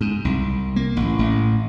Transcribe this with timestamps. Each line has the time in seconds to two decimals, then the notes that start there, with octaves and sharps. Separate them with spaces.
0.01 G#2
0.25 C2
0.76 A#3
0.97 A1
1.19 A1